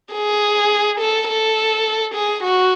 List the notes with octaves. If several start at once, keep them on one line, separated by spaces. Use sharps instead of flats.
G#4
A4
A4
G#4
F#4